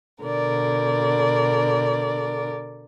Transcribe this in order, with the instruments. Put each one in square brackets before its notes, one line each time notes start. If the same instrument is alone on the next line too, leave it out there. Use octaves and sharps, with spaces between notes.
[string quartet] B2 D3 A#4 D5